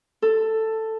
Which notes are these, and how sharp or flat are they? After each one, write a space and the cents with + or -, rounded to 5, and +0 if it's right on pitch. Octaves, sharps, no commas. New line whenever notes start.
A4 +10